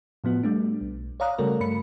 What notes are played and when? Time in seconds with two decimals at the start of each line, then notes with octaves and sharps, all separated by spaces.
0.24 A2 F3 B3 F#4
0.43 G3 A3 D4
0.81 B1
1.20 C#5 D5 F5 A#5 D#6 F#6
1.38 C#3 G3 A3 F#4 A4 A#4
1.60 G2 A3 B5 C#7